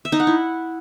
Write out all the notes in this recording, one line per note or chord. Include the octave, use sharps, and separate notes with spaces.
E5
D#4
F#5
E4